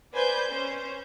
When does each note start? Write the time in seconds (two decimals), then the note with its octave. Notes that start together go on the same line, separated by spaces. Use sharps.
0.13 B4 C5 D5 G#5 G6
0.49 C#4 C5